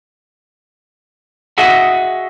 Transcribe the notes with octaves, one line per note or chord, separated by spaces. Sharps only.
F#4 G#4 D#5 E5 F#5